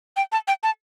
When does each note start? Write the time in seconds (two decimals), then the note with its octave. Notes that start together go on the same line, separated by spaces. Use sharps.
0.17 G5
0.32 A5
0.48 G5
0.63 A5